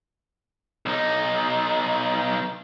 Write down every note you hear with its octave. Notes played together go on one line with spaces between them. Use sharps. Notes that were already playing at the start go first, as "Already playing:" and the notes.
B1 D#4